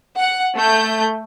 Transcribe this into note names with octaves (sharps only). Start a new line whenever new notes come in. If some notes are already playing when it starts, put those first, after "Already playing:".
F#5
A3 G6